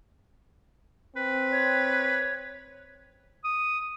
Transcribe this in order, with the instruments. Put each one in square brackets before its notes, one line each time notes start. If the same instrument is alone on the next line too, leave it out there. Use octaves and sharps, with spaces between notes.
[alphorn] C4 [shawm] B4
[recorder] C#5
[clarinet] D#6